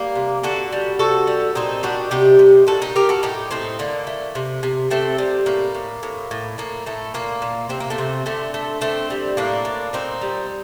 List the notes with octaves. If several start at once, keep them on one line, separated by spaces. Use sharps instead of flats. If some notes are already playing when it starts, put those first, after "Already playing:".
Already playing: G3 A#3
C3
D3 F#4 A4
G3
C3 F#4 A4
G3
A#2 C4 D#4
G3 D4 F#4
C3 D#4 G4
C3
A#2 F#4 A4
D#4 G4
A#2 G4 A#4
F#4 A4
A2 D#4 G4
A2 C4 D#4
D3 A#3
A3
C3
C3
C3 A3 C4
G3
A2 A#3
A2
A2
A2
A2 A#3
A2 A3
A#2 A#3
A#2
C3 C4
A#3
A3 C4
C3
D3 A3 C4
A3
D3 A3 C4
G3
A2 A#3 D4
A2
A#2 C4 D#4
G3